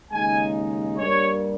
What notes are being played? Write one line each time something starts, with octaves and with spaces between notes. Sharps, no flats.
D#2 C#3 G#3 D#4 G#5
G2 G3 A#3 C#5